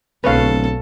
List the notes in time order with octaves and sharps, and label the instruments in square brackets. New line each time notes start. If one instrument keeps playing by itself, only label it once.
[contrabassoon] D1 [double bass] B1 [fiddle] A4 [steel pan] B4 C#5 F5